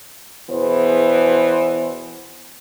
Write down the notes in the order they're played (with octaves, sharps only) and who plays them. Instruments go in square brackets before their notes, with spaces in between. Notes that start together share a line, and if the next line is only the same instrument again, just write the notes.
[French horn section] E2 B2 E3 B3 C5